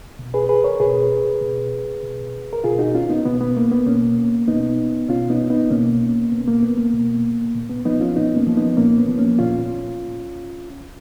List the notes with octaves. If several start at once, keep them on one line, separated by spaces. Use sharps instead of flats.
B2
G#4 B4
G#4 B4
A#4 C#5
B2 G#4 B4
B2
B2
A#4
B2 F4 G#4
D#4 F#4
C#4 F4
B3 D#4
B2 B3
B3
A#3
B3
B2 A#3 C#4
B2 B3 D#4
B2 C#4 F4
B3 D#4
B3 D#4
B2 A#3 C#4
B2 B3
A#3
B3
A#3
B2
A#2
B3
F3 B3 D#4
C#4 F4
A#2 B3 D#4
A#3 C#4
F3
B3 D#4
A#2 A#3 C#4
B3
F3
A#3 C#4
A#2 C#4 F4